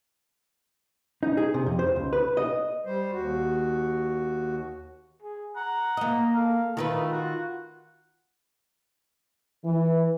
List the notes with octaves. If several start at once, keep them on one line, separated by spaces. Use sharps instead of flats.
D#4
G#4
C3
F2
C5
C#2
B4
D#5
G3 C5
D#2 F#4
G#4
F#5 A#5
A#3 D#5
A4 F5
D#3 A3 F4 A#4 B4
F4 F#4
E3